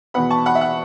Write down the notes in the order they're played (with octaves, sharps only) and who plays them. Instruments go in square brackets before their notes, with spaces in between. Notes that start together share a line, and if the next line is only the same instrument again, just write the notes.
[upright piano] E2 B2 B3 F#5 B5
A5 C#6
F#5 B5
E5
F#5